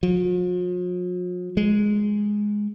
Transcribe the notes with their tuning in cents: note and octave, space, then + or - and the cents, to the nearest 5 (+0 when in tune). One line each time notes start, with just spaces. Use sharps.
F3 +45
G#3 +0